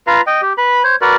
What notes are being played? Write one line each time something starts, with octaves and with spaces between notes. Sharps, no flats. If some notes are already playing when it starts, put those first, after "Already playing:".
F4 B4 F5 A#5
D#5 G5
G4
B4 B5
C5 C#5
F#4 A#4 B4 D5